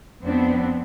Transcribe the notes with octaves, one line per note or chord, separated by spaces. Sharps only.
F2 B3 C4 D4